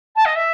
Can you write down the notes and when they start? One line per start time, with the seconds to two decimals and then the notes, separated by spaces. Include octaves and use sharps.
0.16 A5
0.25 D#5
0.35 E5